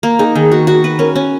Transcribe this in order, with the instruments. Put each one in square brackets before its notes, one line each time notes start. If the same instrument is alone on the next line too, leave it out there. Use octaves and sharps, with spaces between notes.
[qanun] A#3
[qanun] D#4 [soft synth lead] G#4
[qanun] D#3 [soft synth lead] G#4
[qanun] F#4
F#4
B4
[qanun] C#4 [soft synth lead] A#4
[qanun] C#4